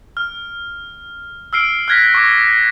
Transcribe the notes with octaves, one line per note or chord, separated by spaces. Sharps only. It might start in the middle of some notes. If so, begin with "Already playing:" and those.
F6
E6 F6 C7 D7
F6 F#6 G#6 A#6 B6
C#6 D6 A#6
A#6